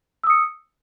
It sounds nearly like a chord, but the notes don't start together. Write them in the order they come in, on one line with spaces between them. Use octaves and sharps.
E6 D#6 C#7